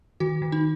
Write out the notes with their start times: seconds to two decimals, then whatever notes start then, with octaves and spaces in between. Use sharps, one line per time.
0.20 D#3 F#4
0.42 D#3
0.52 D#4